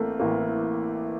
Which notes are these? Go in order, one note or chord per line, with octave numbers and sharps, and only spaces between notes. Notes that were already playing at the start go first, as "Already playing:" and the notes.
Already playing: A1 A2 E3 A3 A#3 C4
A1 A2 E3 A#3